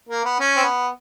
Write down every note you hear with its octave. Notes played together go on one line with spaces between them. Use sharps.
A#3
B3
C#4
C4
B3